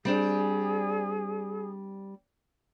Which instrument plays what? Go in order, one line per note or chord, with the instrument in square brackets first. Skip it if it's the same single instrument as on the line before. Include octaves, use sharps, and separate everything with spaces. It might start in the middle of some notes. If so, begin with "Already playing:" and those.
[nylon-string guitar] G3 C4 D4 [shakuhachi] G#4